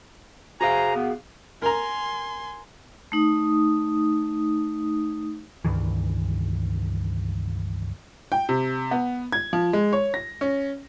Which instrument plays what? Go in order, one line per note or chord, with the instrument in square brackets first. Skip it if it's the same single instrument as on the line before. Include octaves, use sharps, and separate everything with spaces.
[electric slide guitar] F#4 G#4 F5 [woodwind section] C5 G#5 A#5
[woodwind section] B3
[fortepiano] A#4 A#5 [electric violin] G#5 C6
[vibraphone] A3 D#4 D#6
[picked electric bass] C#2 G2 D#3 E3
[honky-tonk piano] G5
C3
B3
G#6
F3
G#3
C#5
A#6
C#4